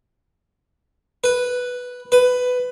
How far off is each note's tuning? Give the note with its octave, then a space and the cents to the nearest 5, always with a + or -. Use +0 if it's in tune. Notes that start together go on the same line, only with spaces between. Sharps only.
B4 +0
B4 +15